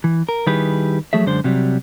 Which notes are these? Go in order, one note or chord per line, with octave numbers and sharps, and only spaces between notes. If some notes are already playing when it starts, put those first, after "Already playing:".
E3
A#4
D#3 G3 E4 G4 G#4 B4
F3 F#3 A3 G#4 E5
F#2 D3 G#3 C5
C3 F#3 G3